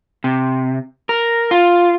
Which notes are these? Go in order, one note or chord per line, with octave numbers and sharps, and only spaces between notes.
C3
A#4
F4